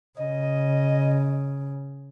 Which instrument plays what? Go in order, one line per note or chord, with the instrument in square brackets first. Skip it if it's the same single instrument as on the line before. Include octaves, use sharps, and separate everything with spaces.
[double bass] C#3 [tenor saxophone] D#5